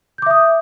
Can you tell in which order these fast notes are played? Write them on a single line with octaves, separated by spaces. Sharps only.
G6 D6 E5 D#6